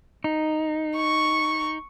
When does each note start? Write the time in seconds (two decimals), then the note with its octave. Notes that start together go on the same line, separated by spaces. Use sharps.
0.24 D#4
0.96 C#6